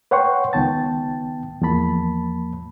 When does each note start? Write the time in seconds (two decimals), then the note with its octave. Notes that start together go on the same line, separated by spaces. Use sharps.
0.11 B4 C#5 F#5 G5 C6 C#6
0.53 C#2 D#3 B3 G5 A5 A6
1.61 E2 F3 A#3 A5 B5